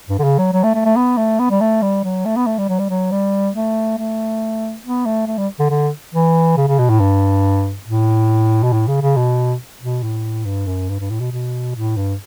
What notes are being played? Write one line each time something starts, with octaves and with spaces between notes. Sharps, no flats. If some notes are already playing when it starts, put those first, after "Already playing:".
G2
D3
C#3
F#3
F#3
A3
A3
A3
B3
A3
B3
G3
A3
G3
F#3
A3
B3
A3
G3
F#3
G3
F#3
G3
A3
A3
B3
A3
A3
G3
D3
D3
E3
C#3
C#3
B2
A2
G2
A2
B2
A2
C#3
C#3
B2
B2
A2
G2
F#2
G2
G2
A2
B2
B2
A2
G2